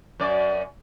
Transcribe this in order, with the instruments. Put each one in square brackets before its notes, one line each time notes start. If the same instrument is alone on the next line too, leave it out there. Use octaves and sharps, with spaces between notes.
[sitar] F#2 D5